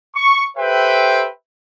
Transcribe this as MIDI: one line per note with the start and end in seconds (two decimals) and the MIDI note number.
0.15 0.44 85
0.57 1.27 67
0.57 1.27 69
0.57 1.27 71
0.57 1.27 72
0.57 1.27 76
0.57 1.27 79